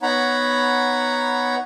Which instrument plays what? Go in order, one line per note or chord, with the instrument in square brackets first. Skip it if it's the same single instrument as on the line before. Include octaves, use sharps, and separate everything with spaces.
[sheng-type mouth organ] B3 D#4 C#5 F#5 A#5 B5